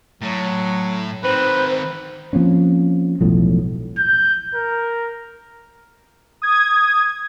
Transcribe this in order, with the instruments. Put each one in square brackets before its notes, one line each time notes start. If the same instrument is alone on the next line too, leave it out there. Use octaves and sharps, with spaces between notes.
[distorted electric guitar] A2 [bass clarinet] F#3
[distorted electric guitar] D#3 C4 [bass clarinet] B4 [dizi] C5
[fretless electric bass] F3 A#3 C4 C#4
E1 B1 A2 F3
[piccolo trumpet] G6
A#4
[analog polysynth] D#6 G#6